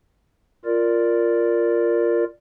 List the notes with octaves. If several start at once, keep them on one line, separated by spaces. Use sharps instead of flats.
F4 A#4 D5